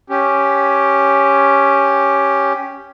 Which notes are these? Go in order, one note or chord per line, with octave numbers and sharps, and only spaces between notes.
C#4 G4